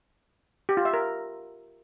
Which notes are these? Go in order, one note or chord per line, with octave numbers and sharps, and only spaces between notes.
G4
F4
E5
A#4